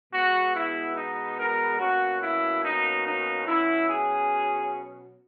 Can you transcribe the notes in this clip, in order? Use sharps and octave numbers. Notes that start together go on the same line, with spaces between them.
B2 G#3 B3 F#4
E4
D#4
A#4
B2 A#3 C#4 F#4
E4
D#4
D#4
B2 F#3 C#4 E4
G#4